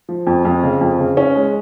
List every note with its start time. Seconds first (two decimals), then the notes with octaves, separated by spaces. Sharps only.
0.09 F3
0.27 F2
0.45 F2
0.63 C#3
0.81 F2
0.99 C#3
1.17 C#4
1.35 G#3